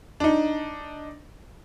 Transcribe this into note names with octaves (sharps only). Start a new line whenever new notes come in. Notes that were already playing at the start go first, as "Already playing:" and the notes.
D4 D#4